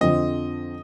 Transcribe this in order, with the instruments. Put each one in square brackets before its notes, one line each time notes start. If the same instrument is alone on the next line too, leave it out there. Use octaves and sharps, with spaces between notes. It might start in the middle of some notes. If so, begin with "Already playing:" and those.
[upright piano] F2 D3 F3 C4 [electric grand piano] D#5